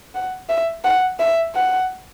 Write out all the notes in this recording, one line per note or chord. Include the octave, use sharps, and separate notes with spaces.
F#5
E5
F#5
E5
F#5